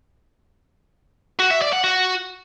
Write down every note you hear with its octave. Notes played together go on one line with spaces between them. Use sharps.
F#4
E5
D5
F#5
F#4